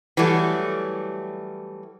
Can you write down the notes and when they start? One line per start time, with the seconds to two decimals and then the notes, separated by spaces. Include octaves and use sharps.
0.17 E3 F#3 G3 A3